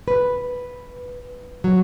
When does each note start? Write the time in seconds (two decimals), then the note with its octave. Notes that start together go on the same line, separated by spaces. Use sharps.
0.08 B4
1.64 F#3